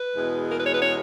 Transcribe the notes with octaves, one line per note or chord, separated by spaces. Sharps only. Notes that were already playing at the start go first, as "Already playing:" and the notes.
Already playing: B4
E2 B2 G#3 B3
A#4
B4
C#5
B4
C#5